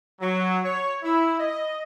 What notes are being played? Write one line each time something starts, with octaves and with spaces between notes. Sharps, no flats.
F#3
C#5
E4
D#5